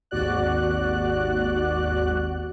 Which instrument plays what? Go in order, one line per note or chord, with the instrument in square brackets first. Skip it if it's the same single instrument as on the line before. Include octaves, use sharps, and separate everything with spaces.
[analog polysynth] G#1 D#2 F#4 D5 F#6